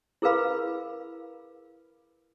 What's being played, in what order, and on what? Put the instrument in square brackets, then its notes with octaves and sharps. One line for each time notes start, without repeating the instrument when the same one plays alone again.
[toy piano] E4 G#4 A#4 B4 F5 B5